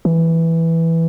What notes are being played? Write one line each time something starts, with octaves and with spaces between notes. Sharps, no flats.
E3